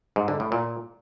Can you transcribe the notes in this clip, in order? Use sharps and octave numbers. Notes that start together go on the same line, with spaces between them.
G#2
D3
A2
A#2